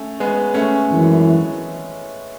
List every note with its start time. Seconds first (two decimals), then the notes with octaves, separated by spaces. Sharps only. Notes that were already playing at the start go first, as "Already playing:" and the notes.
Already playing: A3 C#4
0.20 G#3 B3
0.54 A3 C#4
0.89 G#1 F#2 E3